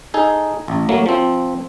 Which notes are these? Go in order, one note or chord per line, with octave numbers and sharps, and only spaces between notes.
D#4 G#4 A4
A1
F#3 A3 A#3
F3 C4